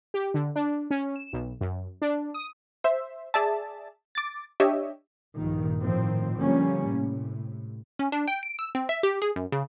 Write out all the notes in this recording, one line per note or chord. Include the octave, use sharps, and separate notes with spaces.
G4
D3
D4
C#4
E7
B1
F#2
D4
D#6
C5 E5
G#4 D5 E5 A5
D6 A6
D4 G4 C#5 D#5 E5
A#1 G2 D#3
A2 D#3 F3 C4
D3 F3 G3 A#3 C#4
A2 C3
C#4
D4
G5
D7
E6
C4
E5
G4
G#4
F#2
C#3